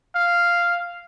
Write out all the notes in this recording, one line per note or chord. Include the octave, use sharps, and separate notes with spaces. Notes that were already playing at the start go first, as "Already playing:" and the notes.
F5